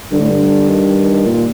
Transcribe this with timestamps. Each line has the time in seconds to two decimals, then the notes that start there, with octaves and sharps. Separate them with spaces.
0.12 G2 D3
0.20 A2
0.29 G2
0.68 D#3
1.26 A#2